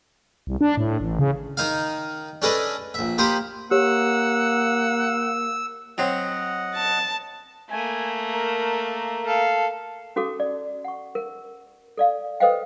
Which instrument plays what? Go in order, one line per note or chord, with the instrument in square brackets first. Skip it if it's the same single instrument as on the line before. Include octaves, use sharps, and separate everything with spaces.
[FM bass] C2
D4
A2
A1
C#3
[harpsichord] D#3 D#4 F5
C#4 D4 G#4 A4 B4 D#5
A#1 E5
A#3 G4 C5 B5 D#6
[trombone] A#3 [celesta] G4 C#5 [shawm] F#5 [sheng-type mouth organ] E6
[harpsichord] F#3 C4 [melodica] D#5 F#5
[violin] A5
[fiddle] A3 A#3 [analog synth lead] G#5
[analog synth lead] A#4
[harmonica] A4 F5
[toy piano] C#4 F#4 A4 D6
D5
F#5 C#6
A#4
A4 D5 F5
A4 B4 C5 D#5 F5 G5